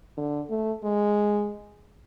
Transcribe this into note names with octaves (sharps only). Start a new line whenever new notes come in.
D3
A3
G#3